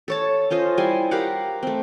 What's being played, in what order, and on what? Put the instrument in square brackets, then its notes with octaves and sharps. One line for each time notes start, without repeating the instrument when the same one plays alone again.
[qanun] A4 C#5 A5
C#4 F4 C5 D#5
G3 E4 G#5 C6
G4 A#4 F5 F#5
A3 C4